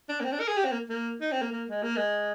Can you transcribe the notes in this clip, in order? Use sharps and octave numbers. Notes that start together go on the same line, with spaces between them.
D4
A#3
C4
D4
A#4
G#4
G4
C4
A#3
A#3
D#4
C4
A#3
A#3
G#3
A#3
G#3